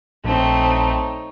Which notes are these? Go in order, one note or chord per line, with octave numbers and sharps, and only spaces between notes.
A#1 A3 C4 D#4 C#5